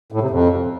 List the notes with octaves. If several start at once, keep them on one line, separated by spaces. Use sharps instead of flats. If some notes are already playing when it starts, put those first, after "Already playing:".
A2
C3
F2